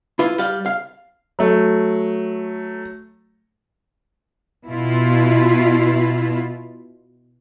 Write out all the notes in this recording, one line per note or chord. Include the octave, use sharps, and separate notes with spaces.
E4 F4 B4
G3 F5
F5
F#3 A3
B2 E4 F4